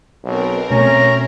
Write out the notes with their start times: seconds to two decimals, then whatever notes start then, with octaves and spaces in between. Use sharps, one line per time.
0.24 B1 C4 A#4
0.71 B2 A3 C#4 A#5